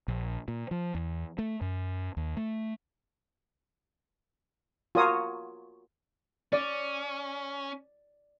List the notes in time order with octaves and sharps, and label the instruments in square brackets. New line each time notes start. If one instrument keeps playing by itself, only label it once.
[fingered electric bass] A#1
A#2
F3
E2
A3
F#2
D#2
A3
[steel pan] F4 F#4 A#4 C#5 D#6
[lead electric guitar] C#4 [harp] D5